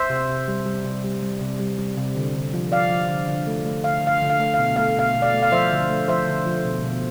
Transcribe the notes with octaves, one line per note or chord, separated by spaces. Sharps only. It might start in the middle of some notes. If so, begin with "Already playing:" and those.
Already playing: C5 E5
C3
C3
G3
G3
C3
G3
G3
C3
G3
G3
C3
D3
D3
F3
F3 D5 F5
F3
D3
D3
A3
A3
D3 F5
D3 F5
D3
F5
A3
B2 F5
A3 F5
B2 F5
B2
D5 F5
A3
F5
F3 C5 E5
D3
A3
F3 C5 E5
D3
F3
B2
B2